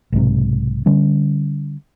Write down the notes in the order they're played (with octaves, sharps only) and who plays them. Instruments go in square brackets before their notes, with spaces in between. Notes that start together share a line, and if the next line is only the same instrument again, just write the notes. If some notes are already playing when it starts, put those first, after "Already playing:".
[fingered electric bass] B1 G#2 C3
D3 G3 C#4